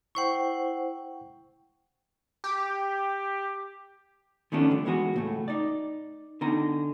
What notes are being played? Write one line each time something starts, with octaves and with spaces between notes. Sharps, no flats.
E4 C5 F#5 G5 C#6
G4
D#3 F3 A3 B3 C#4 D4
G2 D3
E3 G#3 B3 F#4 G#4
C#2 A2 A3
D#4 D5
D3 B3 D#4 G#5 A#5